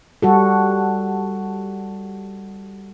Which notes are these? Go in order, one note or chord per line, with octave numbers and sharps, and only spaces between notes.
G3 F#4 A4